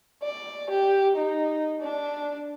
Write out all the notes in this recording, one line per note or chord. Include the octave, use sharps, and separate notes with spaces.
D5
G4
D#4
D4